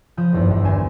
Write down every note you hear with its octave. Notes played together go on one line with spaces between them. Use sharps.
F3 B5 D#6 G6
G#1 E2 G2
A#1 E2
D2 C5 G#5 C6 E7